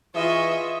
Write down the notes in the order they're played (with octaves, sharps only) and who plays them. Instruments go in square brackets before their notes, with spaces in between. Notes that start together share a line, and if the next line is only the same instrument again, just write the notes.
[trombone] E3 [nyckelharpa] F4 D#5 [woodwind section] G#4 C#6 [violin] E5